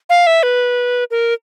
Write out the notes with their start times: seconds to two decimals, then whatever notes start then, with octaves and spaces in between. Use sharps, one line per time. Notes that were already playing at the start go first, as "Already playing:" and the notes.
0.10 F5
0.27 E5
0.43 B4
1.11 A#4